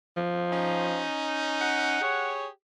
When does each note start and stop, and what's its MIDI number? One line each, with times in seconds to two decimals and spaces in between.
0.17 1.06 53
0.50 2.00 61
0.50 2.00 63
1.61 2.32 78
2.00 2.46 67
2.00 2.46 68
2.00 2.46 73